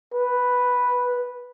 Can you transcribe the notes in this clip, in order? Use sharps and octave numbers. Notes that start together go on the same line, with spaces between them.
B4